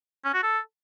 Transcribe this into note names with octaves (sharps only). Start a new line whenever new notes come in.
C#4
F#4
A4